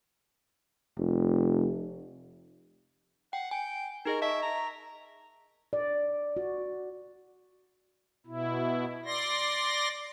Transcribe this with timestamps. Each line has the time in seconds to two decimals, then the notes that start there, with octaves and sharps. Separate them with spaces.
0.97 F1
3.33 F#5 G5
3.51 G5 G#5
4.06 D#4 G#4 A#4 D#5
4.22 D#5 E5 A5 C#6
4.42 A#5
5.73 D5
6.37 F#4
8.26 B2 E4
9.05 D5 C6 A#6